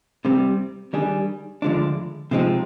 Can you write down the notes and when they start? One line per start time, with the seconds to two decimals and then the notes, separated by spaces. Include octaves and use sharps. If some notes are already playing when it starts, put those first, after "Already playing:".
0.25 C2 C3 G3 C4
0.93 D#3 G3 D4 G#4
1.62 D2 D3 F3 G#3 D4
2.31 C3 F3 G#3 C4 D#4